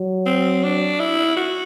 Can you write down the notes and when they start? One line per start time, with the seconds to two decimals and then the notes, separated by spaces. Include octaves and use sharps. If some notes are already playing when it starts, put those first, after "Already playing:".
Already playing: F#3
0.26 C4
0.63 D4
1.00 E4
1.36 F#4